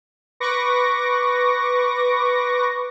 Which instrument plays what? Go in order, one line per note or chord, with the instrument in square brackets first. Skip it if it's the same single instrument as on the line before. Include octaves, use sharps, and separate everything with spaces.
[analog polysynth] B4 C#6 D6 A#6